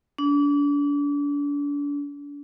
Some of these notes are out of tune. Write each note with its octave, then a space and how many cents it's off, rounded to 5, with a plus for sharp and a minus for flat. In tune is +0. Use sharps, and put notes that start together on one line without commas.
D4 -35